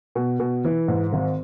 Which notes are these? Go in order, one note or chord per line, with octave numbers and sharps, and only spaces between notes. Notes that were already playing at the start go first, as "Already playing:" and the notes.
B2
B2
E3
G#2
G#1